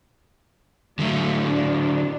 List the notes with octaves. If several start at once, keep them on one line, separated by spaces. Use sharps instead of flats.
D3 F#3 A3
D4